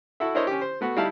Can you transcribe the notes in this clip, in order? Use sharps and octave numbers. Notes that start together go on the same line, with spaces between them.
E4 F#4 A4 E5
D4 E4 A#4 C5 C#5 D#5
C#4 G4
C5
A3 B3 F#4
G3 D#4 E4 F5 A5